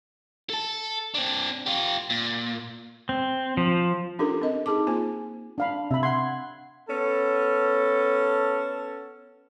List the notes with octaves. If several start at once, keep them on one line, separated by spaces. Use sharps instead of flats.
A4 A5
C4 D4
F4 G4
A#2
C4
F3
C#4 D4 F4 G4 A4 A#4
C4 D4 A#4 D#5
D#4 G#4 A5 D6
A#3 F4 C5 G#5
D4 F5 B5
C3 E5 B5
F#5 C6 G#6
B3 C#4 A4